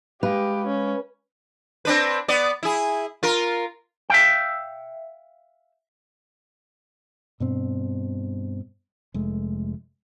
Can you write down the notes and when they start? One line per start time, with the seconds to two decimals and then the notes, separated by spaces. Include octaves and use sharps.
0.23 G#3 G4 B4 F5
0.67 C#4
1.85 C4 D4 B4
2.28 B3 D5
2.63 E4 G#4
3.23 F4 A#4
4.10 E5 F5 G5
7.40 G2 B2 C4
9.14 F1 G#3 A3